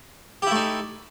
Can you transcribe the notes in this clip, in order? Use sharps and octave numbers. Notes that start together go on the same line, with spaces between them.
A3 D#4 E4 G4